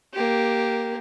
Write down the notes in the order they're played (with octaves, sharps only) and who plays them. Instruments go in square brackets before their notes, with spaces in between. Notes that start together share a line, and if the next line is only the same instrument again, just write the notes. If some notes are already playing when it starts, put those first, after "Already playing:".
[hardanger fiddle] A#3 G4